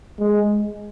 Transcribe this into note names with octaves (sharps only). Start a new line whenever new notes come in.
G#3